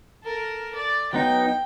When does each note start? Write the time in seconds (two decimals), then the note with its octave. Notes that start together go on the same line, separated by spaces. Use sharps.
0.23 A4 A#4
0.75 D5
1.13 F#3 B3 D#4 G5